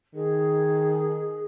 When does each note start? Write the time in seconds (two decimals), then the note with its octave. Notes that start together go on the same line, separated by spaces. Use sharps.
0.15 D#3 G#4